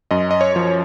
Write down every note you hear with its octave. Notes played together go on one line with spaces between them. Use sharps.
F#2 D#5
D#5
C#5
F3